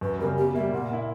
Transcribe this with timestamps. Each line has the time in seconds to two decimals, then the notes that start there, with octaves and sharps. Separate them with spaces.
0.01 F#2 B4
0.19 G3 A#4
0.23 C#3
0.37 B2 G4
0.55 A#3 E5
0.58 G3
0.72 A#2 F#5
0.90 A#3 E4